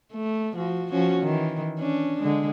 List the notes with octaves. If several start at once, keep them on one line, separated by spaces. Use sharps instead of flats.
A3
F3 F#4
F3 C#4 F#4
D#3 E3
C#4 D4
D3 G#3